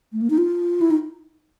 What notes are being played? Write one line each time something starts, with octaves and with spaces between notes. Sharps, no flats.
A3
A#3
D#4
F4
E4
D#4